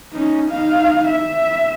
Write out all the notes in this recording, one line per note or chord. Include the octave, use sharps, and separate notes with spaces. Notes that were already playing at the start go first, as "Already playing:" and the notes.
C#4 D#4
D#4 F5
E5